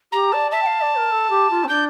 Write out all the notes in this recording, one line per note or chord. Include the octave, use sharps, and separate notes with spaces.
G4 A#5
D5 A5
E5 A5
G5
F5
D5
A#4
A4
G4
F4
C4
D4 G6